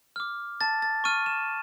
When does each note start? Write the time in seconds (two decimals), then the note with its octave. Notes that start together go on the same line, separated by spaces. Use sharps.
0.16 D6 F6
0.61 A5 A6
0.82 A6
1.04 C#6 F6 D#7
1.26 E7